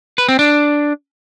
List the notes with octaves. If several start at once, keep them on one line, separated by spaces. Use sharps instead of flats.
B4
C4
D4